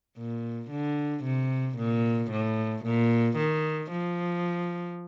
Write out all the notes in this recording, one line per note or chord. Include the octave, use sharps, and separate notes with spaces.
A#2
D3
C3
A#2
A2
A#2
D#3
F3